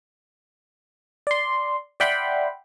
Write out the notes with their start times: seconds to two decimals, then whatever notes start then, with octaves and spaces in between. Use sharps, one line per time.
1.27 D5 C6
2.00 D5 E5 F#5 G5 B5 C6